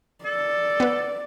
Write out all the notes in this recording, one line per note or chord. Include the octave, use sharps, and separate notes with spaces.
A4 D5
B3 B4